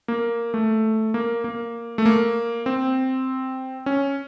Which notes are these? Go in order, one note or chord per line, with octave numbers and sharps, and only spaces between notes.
A#3
A3
A#3
A#3
A3
A#3
C4
C#4